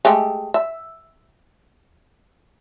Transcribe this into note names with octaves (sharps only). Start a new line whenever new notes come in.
G#3 A3 G4
E5